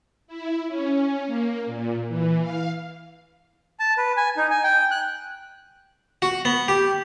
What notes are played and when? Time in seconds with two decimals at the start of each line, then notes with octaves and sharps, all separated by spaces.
0.27 E4
0.68 C#4
1.26 A#3
1.66 A#2
2.08 E3
2.41 F5
3.80 A5
3.97 B4
4.17 G#5
4.37 D#4
4.50 G#5
4.64 G5
4.91 F#6
6.22 F#4
6.45 B3
6.68 G4